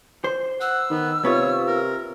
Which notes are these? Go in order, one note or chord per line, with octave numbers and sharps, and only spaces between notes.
C5
F#5 E6
D#3 B3
C3 B3 F4 C#5
A#4